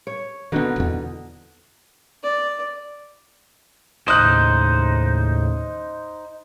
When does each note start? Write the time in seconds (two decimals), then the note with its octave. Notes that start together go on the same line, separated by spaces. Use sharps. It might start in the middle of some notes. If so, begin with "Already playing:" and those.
0.07 C#5
0.52 B2 D3 D#3 B3 D#4
0.76 D#1 E2
2.23 D5
4.08 D#2 A2 C#3 D#4 C5 D#6 F#6